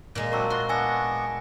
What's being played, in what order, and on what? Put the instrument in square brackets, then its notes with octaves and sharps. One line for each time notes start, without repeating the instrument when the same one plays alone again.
[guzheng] A#2 G#3
[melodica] F#3 C4 D4 [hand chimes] A#4 C#6 E6
[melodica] F4 F#4 [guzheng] C6
[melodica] B3 D4 C#6 [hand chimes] G#5 E6 A#6